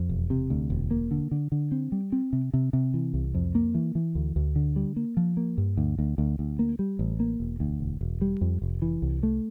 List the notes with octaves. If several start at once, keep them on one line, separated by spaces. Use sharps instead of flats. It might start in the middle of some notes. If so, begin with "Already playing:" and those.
Already playing: F2
E1
C3
D2
E1
A#3
D3
D3
D3
C4
G3
C4
C3
C3
C3
E3
C2
F2
A#3
E3
E3
D2
D2
D3
G3
A#3
F3
A#3
G2
D2
D2
D2
D2
A#3
G3
A1
A#3
E1
D2
E1
E1
G3
F2
F1
E3
C2
A3